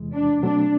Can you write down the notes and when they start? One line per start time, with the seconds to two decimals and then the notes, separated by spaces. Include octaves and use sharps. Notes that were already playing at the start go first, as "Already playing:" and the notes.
Already playing: E2 C3 E3 G#3
0.15 D4
0.43 B2 F#3 A3 C4 D4